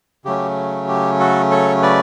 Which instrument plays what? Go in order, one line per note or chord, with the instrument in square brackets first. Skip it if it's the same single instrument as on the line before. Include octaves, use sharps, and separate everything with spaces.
[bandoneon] C#3 F#3 A3 C#4 G4
G4
F#4 A4
A4 C#5
B4 D5